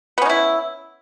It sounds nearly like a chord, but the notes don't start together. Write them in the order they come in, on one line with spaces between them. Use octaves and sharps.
B3 C#4 D#4 E4